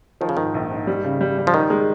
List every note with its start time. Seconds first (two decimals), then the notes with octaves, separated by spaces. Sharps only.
0.21 D#3 F3
0.29 C#3
0.37 G#2 D#3
0.54 A#1
0.71 G#2
0.87 G3
1.04 C#3
1.21 G3
1.38 G3
1.47 F3
1.54 D#3 D#4
1.70 G#3